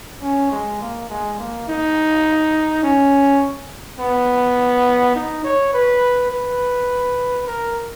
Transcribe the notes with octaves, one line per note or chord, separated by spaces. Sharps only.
C#4
G#3
A#3
G#3
A#3
D#4
C#4
B3
D#4
C#5
B4
B4
A#4